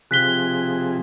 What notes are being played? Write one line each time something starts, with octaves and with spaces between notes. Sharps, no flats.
C3 F3 G#4 F#6 B6 G7